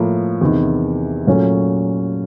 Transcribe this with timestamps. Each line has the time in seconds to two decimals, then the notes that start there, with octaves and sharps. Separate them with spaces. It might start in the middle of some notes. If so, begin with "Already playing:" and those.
Already playing: A2 F3 A#3
0.41 E2 C3 D#3
1.27 A#2 F#3 A3 C#4